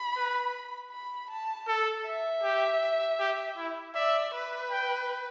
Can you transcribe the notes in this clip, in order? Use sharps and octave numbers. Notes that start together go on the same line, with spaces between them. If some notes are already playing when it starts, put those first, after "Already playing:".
Already playing: B5
B4
B5
A5
A4
E5
G4
G4
E4
D5 E5
B4
G5